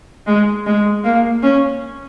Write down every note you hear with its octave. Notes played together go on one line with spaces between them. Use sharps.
G#3
G#3
A#3
C#4